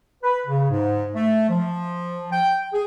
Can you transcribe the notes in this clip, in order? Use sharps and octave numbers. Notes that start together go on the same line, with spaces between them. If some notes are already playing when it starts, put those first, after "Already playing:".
B4
C#3
G#2
A3
F3
G5
G#4